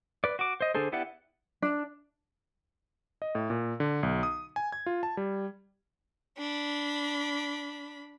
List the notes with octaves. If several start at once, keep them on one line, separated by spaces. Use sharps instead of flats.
B4 D5
F#4 D6
C5 D#5
D3 D4 G#4 A4 C5
B3 E4 G4 D5 F#5
D4
D#5
A2
A#2
D3
B1
D#6
G#5
G#6
F4
A5
G3
D4 B5